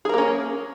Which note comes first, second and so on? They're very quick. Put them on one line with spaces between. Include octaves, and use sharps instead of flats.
G#4 A#4 A#3 C#4